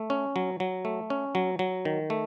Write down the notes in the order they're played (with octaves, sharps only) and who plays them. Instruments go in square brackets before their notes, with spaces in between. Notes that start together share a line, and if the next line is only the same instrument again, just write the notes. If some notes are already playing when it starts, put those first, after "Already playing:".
Already playing: [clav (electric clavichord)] A3
C#4
F#3
F#3
A3
C#4
F#3
F#3
D#3
A3